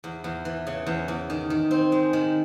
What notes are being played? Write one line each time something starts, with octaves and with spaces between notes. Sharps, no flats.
E2
E2
E3
C#3
E2
E2
D#3
D#3
C4
G#3
D#3